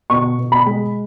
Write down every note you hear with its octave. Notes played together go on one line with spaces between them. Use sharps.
B2 C#6
B2
B5
G#3